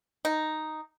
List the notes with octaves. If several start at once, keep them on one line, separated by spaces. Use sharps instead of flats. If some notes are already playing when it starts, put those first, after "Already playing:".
D#4